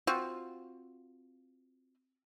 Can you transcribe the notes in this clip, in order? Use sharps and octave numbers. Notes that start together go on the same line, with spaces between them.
C4 F4 F#4